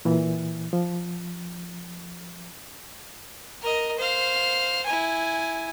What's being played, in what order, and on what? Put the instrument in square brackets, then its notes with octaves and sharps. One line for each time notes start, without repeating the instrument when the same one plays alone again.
[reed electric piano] A#2 E3
F3
[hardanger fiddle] A#4 D#5
C5 F5
E4 G#5